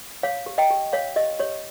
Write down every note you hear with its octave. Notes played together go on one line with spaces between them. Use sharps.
C#5 F5
G4
D#5 G5
G4
C#5 F5
G4 D#5
G4 C#5